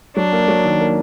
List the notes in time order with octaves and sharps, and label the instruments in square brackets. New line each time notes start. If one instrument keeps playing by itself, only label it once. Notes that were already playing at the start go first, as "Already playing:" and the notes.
[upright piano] F#3 [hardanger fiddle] D4
[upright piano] A#3
F#3
D#3
A#3